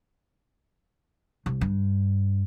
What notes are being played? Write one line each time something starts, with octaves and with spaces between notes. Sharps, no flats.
C2
G2